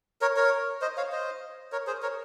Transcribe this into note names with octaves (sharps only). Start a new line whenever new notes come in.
A#4 C#5
A#4 C#5
C5 D#5
C#5 F5
C5 D#5
A#4 C#5
G#4 C5
A#4 C#5